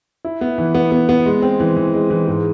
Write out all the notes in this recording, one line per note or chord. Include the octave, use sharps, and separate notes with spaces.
E4
B3
E3
B3
B3
B3
G#3
C4
E3
E3
G#3
E3
G#2